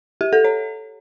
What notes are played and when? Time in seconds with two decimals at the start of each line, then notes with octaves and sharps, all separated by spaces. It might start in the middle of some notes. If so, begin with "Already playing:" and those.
0.21 G4
0.33 A4
0.44 C#5